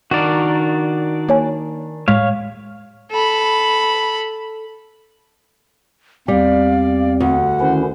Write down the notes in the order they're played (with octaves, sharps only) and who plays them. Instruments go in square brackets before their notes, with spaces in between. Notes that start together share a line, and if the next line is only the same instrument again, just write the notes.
[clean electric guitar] D#3 D4 A#4 [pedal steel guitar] F#4 D5
[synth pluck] A#3 C#5 G#5
[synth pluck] A2 G#3 B6 [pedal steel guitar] C#5 F5
[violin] A4 B5
[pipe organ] E2 C4 [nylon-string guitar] G3 [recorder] D5 [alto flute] F5
[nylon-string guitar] D2 [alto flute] F#5
[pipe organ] D#3 C#4 E4 [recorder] C5